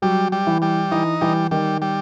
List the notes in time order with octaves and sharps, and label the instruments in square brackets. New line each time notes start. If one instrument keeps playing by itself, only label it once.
[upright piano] F#3 [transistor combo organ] G3
[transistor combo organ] G3
[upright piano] E3
[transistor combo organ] G3
[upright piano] E3 [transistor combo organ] D#4
[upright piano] E3 [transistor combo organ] G3
[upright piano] D#3 [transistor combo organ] G3
[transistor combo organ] G3